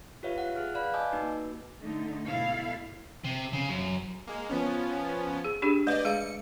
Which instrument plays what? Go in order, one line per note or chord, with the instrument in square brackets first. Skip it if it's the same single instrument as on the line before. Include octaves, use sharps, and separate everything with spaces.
[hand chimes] F4 G4 B4 C#5 E5 F5
F4 F#5
G#4 F6 F#6
B4 D5 F5 B5 F#6
D#5 G#5 A5 D6 E6 G6
A#3 D#4 F#4 B4
[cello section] D3 A3 D#4
G#2 B2 E4 A4 F5
[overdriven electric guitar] C3
C#3
F#2
[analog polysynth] G#3 A#3
F3 B3 C#4
[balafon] G#4
D4 G4 G#4
[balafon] A3 B4 [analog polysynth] D5 D#5
[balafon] G#3 G#4 F5 [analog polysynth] C#7